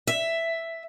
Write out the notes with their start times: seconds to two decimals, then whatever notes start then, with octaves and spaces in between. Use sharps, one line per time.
0.07 E5